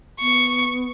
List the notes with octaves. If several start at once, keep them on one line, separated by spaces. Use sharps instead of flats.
B3 C#6